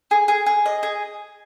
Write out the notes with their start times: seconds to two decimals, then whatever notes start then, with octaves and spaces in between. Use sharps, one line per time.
0.11 G#4
0.28 G#4
0.46 G#4
0.66 D#5
0.83 G#4